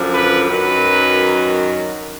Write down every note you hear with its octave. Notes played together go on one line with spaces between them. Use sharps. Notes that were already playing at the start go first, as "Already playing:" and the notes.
Already playing: F#2 D3 F3
B4
F#2 D#3 F#3 B4